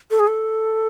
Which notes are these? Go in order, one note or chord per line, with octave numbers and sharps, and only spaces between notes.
A4
G#4
A4